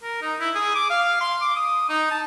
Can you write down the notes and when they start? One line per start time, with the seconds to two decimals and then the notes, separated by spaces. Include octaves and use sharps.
0.03 A#4
0.22 D#4
0.40 E4
0.55 G#4
0.75 D6
0.90 F5
1.21 C6
1.41 D6
1.56 D#6
1.89 D#4
2.11 A5